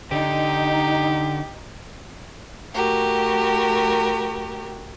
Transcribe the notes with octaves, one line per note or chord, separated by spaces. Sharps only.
D3 D#4 G4
A3 F#4 G4 A#4